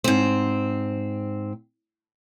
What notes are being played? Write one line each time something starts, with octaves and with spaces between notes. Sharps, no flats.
G#2 C4